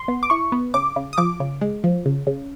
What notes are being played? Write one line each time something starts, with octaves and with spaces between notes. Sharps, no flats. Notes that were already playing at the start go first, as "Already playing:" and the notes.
Already playing: C6
B3
D6
E4 C#6
B3
C#3 D6
C#3
D#6
F3 D6
C#3
G#3
F3
C#3
C#3